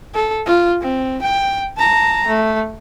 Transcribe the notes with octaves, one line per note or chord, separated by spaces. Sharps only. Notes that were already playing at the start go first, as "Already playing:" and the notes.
A4
F4
C4
G5
A5 A#5
A3